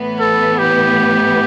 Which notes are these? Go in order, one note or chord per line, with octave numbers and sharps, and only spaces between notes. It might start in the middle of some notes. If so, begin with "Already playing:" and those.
Already playing: A2 E3 B3
A4
G4